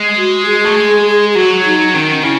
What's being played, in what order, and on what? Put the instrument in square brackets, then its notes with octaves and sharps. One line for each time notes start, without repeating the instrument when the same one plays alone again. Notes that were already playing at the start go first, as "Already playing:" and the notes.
Already playing: [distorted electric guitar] G#3
[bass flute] F#4
G#4
[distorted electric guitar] A3
G#3
[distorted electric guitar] F#3 [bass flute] F#4
[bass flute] D#4
[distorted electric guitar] D#3 [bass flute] C#4
[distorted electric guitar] C#3 [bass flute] E4